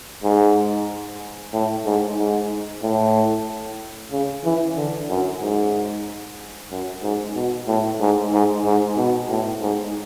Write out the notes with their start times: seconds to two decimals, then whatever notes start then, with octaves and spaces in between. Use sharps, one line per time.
0.23 G#2
1.53 A2
1.85 G#2
2.18 G#2
2.82 A2
4.11 C#3
4.45 E3
4.77 D3
5.09 F#2
5.41 G#2
6.71 F#2
7.03 G#2
7.35 B2
7.67 A2
8.00 G#2
8.32 G#2
8.65 G#2
8.97 B2
9.29 A2
9.62 G#2